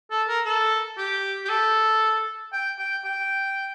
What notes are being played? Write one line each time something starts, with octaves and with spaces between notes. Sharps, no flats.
A4
A#4
A4
G4
G4
A4
G5
G5
G5